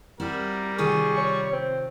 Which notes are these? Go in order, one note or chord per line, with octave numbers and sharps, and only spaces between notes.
G3 C4 E4 F#4 A#4
C3 D#3 F4 G#4 C#6
C#5
C4